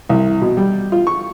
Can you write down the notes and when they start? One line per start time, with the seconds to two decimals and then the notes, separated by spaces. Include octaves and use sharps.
0.09 C2
0.41 B2
0.57 G3
0.92 F4
1.07 C#6